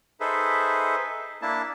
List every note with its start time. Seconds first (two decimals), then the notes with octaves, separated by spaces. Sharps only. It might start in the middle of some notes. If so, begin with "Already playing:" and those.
0.20 D#4 G#4 A4 B4 C5 E5
1.42 A#3 D4 E4 A5